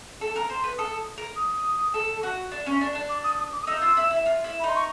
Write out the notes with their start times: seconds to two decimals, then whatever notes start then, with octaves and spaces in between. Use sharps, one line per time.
0.21 A4
0.36 A#4
0.50 C5
0.64 B4
0.78 A4 D#6
1.18 A#4
1.36 D#6
1.94 A4
2.23 F#4
2.51 D4
2.66 C#4
2.81 D4
2.95 D4
3.09 D6
3.24 D#6
3.39 D#6
3.53 D6
3.62 D#6
3.67 D#4 E6
3.82 F4
3.97 E4
4.11 E4
4.26 F4
4.44 E4
4.60 B5
4.64 D#4 C6
4.75 C#6